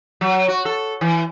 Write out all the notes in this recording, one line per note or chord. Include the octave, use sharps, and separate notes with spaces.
F#3
F#4
A4
E3